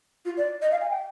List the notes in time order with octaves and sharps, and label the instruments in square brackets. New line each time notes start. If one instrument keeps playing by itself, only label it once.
[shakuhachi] F4
D5
D#5
F5
G#5
G5